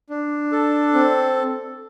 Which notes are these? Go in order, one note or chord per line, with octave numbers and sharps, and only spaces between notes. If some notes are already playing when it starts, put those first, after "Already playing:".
D4
A4
C4